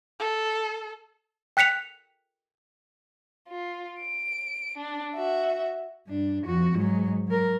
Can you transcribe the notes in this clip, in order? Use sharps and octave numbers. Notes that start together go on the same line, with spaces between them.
A4
G5 F#6 B6 C#7 F7
F4
D7
D4
F#4 E5
G2 D4
F2 F#4
G#2 F#3
F#3 A#4